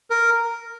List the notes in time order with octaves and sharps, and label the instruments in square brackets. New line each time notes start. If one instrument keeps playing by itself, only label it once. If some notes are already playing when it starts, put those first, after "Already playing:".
[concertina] A#4